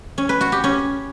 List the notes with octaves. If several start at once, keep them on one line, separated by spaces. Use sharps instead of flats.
C#4
B4
F#4
G4
C#4